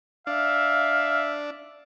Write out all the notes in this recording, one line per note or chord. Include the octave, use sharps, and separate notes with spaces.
D4 E5 F5